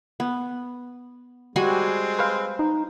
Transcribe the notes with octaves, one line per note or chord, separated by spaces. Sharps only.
B3
G3 G#3 C4 F#4 G#5
B4 C5 F5
D#4